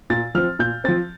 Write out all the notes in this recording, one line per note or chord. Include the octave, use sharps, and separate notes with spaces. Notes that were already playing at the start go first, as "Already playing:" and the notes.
A#2 A6
F3 C4 F6
A#2 G6
F3 C4 A6